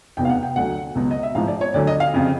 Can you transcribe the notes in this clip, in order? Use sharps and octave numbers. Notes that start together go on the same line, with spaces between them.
F1 E2 B2 G5
F5
F#5
G5
D2 D3 F#3 F#5
C#2 B2 F#3
D#5
E5
A1 G#2 F3 F5
D5
C#5
D2 D3 F#3 D5
D#5
F5
F2 C#3